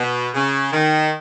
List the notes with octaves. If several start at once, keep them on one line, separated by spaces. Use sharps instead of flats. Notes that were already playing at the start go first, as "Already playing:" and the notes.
Already playing: B2
C#3
D#3